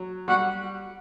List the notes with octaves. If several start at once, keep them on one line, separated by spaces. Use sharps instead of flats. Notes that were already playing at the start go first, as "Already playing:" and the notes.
Already playing: F#3
G3 F#4